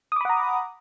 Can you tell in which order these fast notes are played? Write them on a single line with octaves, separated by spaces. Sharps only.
D#6 D6 B5 F#5 A#5